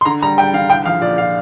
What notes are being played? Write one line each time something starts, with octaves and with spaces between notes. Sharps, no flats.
C6
D3 A#5
G3 A#5
G3 G5
D3 F5
C2 G5
F3 F5
A#2 D5
A#2 F5